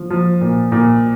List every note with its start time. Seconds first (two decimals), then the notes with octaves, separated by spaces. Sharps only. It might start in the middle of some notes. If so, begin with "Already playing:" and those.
Already playing: F3
0.10 F3
0.41 A#2
0.72 A#2